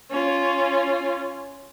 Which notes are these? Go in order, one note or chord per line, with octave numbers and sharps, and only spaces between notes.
C#4 F4